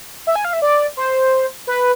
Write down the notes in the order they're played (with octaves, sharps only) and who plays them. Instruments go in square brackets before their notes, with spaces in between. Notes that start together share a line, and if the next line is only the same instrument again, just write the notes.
[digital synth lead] E5
G#5
F5
E5
D5
C5
B4